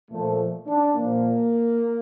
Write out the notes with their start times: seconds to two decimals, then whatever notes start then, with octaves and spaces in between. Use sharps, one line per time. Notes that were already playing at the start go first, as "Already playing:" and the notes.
0.11 A#2 F3 A3
0.67 D4
0.95 A#2 F3 A#3